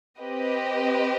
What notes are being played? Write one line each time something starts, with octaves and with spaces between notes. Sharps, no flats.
C4 G4 B4 D#5